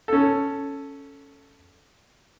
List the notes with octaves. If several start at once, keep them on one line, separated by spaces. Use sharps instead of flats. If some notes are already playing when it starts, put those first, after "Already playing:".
C#4 A4